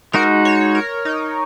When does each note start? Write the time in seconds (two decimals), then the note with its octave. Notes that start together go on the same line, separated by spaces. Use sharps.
0.13 G#3 D#4 F#4 A#4
0.45 C#5
0.75 A#4
1.05 D#4